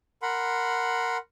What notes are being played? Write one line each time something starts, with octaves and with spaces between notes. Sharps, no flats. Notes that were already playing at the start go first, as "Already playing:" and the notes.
A#4 F#5 B5 C6